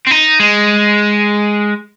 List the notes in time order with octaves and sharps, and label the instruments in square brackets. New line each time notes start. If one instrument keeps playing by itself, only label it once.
[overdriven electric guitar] C4
D#4
G#3